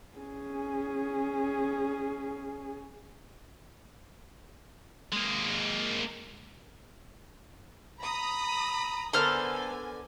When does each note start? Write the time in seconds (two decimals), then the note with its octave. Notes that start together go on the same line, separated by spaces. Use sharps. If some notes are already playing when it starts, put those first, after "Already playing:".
0.18 C#4 G#4
5.13 G#3 A#3
8.01 A#5 B5 D#6
9.13 D3 B3 D4 A4 A#4 C5 G#5 F6